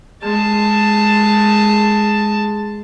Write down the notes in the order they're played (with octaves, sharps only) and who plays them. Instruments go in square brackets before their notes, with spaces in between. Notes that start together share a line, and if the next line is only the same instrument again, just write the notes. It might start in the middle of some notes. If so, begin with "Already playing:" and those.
[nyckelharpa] G#3 A5